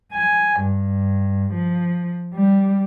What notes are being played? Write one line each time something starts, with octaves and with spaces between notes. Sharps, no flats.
G#5
G2
F3
G3